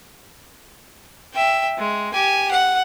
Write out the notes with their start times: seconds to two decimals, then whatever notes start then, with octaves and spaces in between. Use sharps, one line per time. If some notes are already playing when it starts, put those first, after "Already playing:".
1.34 E5 G5
1.78 G#3
2.13 G4 G#5
2.51 F#5